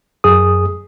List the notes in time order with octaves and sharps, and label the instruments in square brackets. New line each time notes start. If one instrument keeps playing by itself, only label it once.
[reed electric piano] F#2 G#4 D#6